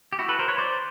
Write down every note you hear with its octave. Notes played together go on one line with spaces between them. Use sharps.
G4
E4 F#4
A4 B4
A#4 C5
B4 C#5
C5 D5